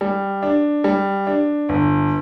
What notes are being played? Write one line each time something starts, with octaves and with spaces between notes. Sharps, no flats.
G3
D4
G3
D4
G1